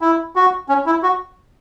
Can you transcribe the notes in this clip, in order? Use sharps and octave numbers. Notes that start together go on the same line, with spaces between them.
E4
F#4
C#4
E4
F#4